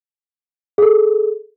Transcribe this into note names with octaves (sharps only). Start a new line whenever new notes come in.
G#4 A4